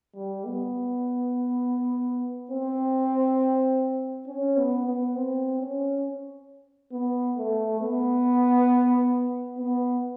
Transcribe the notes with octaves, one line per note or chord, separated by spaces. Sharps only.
G3
B3
C4
C#4
B3
B3
C4
C#4
B3
A3
B3
B3